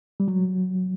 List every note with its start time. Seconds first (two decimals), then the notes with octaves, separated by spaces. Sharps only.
0.20 G3
0.28 F#3